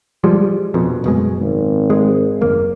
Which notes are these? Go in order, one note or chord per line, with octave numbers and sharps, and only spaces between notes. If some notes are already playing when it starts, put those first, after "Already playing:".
F3 G3 G#3
A#1 F2 B2
F#1 B2 G#3
G#1
G#3
F#1 D#2 A#3